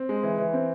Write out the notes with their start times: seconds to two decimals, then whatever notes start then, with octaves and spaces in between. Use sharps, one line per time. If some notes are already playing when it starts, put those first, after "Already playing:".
Already playing: C4
0.09 G#3
0.23 E3
0.38 E3
0.53 C4